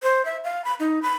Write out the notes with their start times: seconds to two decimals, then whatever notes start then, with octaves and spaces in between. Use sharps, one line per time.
0.03 C5
0.25 E5
0.44 F5
0.65 B5
0.80 D#4
1.02 B5